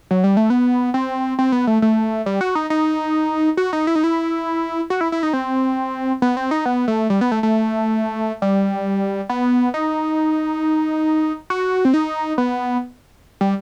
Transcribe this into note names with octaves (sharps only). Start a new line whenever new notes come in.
F#3
G3
A3
B3
C4
C4
B3
A3
A3
G3
F#4
D#4
D#4
F#4
D#4
E4
D#4
E4
F#4
E4
E4
D#4
C4
B3
C4
D#4
B3
A3
G3
B3
A3
A3
G3
B3
D#4
F#4
C4
D#4
B3
G3